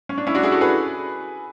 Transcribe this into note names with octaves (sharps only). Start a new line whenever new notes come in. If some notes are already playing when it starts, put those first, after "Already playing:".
C#4
D4
C#4 E4
D4 F#4
E4 G#4
F#4 A4
G#4 B4